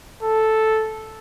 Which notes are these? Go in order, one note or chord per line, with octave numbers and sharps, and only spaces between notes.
A4